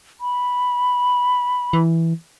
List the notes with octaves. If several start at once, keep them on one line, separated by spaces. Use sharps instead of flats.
B5
E3